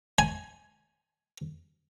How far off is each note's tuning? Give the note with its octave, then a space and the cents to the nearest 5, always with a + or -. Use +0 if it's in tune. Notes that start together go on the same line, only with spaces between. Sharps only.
G#5 +10